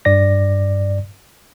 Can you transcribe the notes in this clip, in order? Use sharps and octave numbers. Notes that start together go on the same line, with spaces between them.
G2 D5 A#6